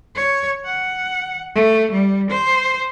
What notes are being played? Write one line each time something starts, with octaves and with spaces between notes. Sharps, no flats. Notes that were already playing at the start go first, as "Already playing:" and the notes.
C#5
F#5
A3
G3
C5